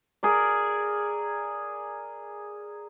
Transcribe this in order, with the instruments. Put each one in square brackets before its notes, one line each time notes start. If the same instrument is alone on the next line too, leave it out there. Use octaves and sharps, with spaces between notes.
[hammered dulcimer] G#4 A#4 D5